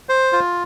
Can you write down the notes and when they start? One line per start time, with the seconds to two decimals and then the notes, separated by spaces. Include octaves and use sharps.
0.09 C5
0.33 F4